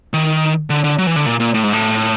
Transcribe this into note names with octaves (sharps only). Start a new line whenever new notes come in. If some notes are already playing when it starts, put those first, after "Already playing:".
D#3
D3
D3
F#3
E3
D3
A#2
A#2
A2
G#2
A2